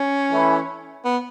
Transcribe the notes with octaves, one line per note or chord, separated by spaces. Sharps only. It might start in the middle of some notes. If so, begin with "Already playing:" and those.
Already playing: C#4
E3 A3 E4
B3